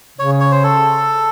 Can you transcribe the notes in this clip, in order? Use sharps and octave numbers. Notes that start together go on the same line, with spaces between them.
C#3 C#5
C#5
C5
A4